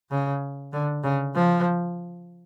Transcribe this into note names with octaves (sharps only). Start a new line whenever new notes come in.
C#3
D3
C#3
F3